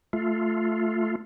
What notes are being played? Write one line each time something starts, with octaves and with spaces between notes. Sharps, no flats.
A3 F4